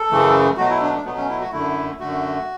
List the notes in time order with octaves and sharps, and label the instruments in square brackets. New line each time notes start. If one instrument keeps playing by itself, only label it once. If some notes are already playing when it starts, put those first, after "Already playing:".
Already playing: [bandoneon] A4
F#2 C#3 E3 A3
B2 F#3 A3 F#4
E4
D4
D4
B2 F#3 A3 B3
C#4
E4
F#4
F#2 D3 A3 E4
F#2 D3 A3 F#4